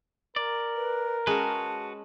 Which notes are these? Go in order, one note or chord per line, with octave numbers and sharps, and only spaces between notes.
A#4 D5
B4
G#3 C#4 F#4 G#4 B4 A5